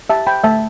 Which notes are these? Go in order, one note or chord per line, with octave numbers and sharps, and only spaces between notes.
G4 E5 A5
G5 B5
A3 E5 A5